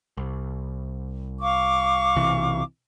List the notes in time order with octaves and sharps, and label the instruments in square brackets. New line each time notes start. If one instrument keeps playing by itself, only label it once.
[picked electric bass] C2
[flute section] F5 C#6 D6
[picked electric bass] B1 C3 E3